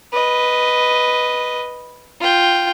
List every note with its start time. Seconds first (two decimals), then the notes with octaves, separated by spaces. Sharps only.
0.13 B4 D#5
2.20 F4 G5